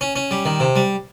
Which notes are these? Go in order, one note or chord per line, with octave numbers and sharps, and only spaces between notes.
C#4
C#4
G3
D#3
C3
G3